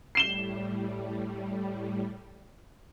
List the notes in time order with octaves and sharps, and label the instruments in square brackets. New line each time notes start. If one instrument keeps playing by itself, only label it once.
[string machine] A2 G3 [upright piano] C7 E7 G7